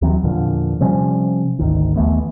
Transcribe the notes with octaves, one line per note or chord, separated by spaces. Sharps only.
D#2 E3 F#3 C4
E2 A#2 D3 F3
C3 F3 G3 C#4
G#1 D2 D#3
D#2 E3 A3 B3